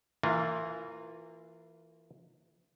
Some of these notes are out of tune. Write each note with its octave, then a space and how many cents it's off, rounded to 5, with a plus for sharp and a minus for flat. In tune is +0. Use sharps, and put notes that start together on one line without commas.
E3 +5 A#3 -25 F4 +15